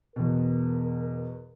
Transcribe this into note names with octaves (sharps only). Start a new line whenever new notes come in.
E2 B2 A#4